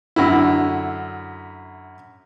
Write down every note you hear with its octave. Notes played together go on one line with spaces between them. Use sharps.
F#2 D3 E4